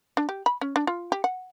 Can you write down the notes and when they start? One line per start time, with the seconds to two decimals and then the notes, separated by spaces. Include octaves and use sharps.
0.17 D4
0.29 G4
0.46 B5
0.61 C#4
0.76 D4
0.87 F4
1.12 G4
1.24 F#5